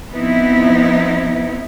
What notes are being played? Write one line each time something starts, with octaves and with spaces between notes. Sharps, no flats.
F3 B3 C4 D#4 E4